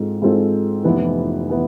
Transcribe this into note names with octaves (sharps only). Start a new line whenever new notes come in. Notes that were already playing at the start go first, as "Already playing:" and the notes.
Already playing: G#2 G#3 C4 F4 A4
G#2 G#3 C4 F4 A4
F1 F2 E3 B3
E3 B3